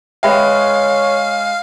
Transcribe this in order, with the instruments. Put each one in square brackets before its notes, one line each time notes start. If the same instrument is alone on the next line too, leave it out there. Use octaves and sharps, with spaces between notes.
[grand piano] G#3 G#4 B4 [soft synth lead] C#5 [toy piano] E5 G5 B5 [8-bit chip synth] F5